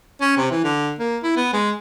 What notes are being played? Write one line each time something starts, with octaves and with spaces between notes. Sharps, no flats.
C#4
C3
E3
D3
A#3
E4
B3
G#3